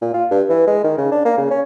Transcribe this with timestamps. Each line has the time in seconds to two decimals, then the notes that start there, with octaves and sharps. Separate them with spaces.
0.02 A#2
0.14 F4
0.31 G2
0.49 E3
0.67 G#3
0.84 D#3
0.98 C#3
1.12 D4
1.25 A#3
1.38 C#3
1.50 C#4